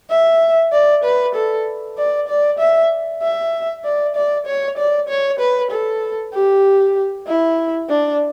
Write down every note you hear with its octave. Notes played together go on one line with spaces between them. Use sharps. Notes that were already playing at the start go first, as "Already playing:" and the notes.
E5
D5
B4
A4
D5
D5
E5
E5
D5
D5
C#5
D5
C#5
B4
A4
G4
E4
D4